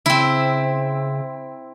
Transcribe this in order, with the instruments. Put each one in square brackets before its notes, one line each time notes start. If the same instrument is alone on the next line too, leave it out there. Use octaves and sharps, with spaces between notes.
[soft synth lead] C#3 [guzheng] C4 E4